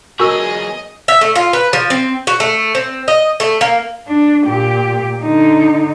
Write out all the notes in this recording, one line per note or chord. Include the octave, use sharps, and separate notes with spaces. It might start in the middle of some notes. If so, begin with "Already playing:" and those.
B1 F#4 G#4 A#4 D#5 E6
E5
A3
F4
B4
F3
C4
F#4
A3
C4
D#5
A3
A#3
D4
A#2 G4
D3 D#4